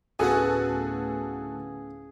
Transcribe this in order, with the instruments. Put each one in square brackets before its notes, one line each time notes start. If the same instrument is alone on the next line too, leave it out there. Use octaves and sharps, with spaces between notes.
[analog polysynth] D2 A2 [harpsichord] C#3 B3 [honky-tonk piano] F#4 A4 G#5 [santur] G#4